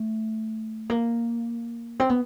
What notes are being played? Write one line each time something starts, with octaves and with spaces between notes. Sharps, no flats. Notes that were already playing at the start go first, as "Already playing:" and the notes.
Already playing: A3
A#3
C4
B3